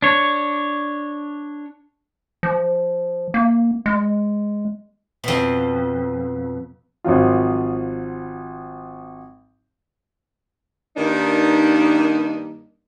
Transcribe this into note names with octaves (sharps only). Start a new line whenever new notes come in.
D4 C#5
F3
A#3
G#3
F2 B2
G#1 F3 F#3 F4
G2 D#3 G3 A#3 D4 D#4